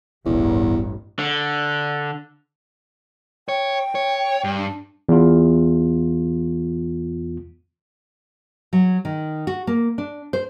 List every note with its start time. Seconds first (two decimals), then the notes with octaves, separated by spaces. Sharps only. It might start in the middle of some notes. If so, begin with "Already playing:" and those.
0.26 D1 A1 E2 G2
1.19 D3
3.49 C#5 G5
3.95 C#5
4.44 G2
4.58 D4
5.09 E2 F4
8.73 F#3
9.05 D#3
9.47 F#4
9.67 A#3
9.98 D4
10.33 C5